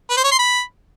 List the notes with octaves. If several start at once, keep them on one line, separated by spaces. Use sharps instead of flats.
B4
C5
C#5
C6
B5